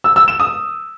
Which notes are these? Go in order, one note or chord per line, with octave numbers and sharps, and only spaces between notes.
E6
E6
E7
D#6